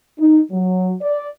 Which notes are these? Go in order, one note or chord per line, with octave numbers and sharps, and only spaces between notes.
D#4
F#3
D5